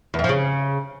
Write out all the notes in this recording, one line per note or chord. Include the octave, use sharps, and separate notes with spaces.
E2
F2
F3
C#3